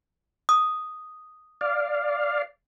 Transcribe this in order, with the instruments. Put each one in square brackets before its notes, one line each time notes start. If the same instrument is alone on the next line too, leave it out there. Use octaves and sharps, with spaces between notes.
[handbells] D#6
[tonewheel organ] D5 F5